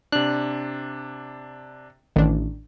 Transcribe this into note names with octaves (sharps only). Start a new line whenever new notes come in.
C3 D4 F#6
A1 D#3 D4